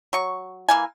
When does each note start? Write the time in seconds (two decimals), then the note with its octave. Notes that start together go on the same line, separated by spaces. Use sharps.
0.13 F#3 C#6
0.69 E3 A#3 G#5